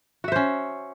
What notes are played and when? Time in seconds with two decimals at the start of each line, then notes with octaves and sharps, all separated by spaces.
0.24 F#4
0.28 E5
0.32 C5
0.36 C#4